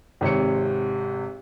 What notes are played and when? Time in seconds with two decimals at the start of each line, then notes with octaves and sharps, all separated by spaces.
0.21 G#1 C3 C#5 C#7